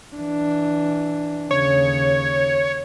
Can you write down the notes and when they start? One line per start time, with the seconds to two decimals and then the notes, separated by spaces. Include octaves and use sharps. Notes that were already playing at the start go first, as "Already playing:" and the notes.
0.16 E3 D4
1.51 D#2 C#3 C#5